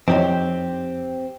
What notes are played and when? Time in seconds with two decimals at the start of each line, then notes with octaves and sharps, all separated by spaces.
0.08 F2 F3 C4 D#4 E4 G4 C#5 G5